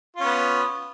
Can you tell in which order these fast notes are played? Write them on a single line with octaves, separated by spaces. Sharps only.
F4 C#4 B3